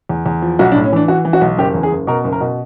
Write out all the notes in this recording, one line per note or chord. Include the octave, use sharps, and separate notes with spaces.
E2
E2
F3
B1 F#4
D4
A2
C#4
E3 D4
E3 F#4
E3
F#4
B1
F#1 G4
E2
G#4
F#1
B2 A#4
F#1
A#4
B2